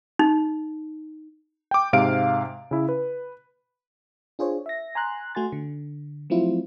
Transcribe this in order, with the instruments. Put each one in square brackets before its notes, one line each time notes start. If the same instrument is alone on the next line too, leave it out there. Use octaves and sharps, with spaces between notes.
[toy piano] D#4
[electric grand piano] G5 D6
G#2 C3 F5 D7
C#3 E4
B4
[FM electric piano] D4 F4 G#4 C5 C#5
E5 A#6
G#5 A#5 C6 F#6
A3 F#4 G#5 C6 A6
D3
F3 F#3 A3 C4 E4 F4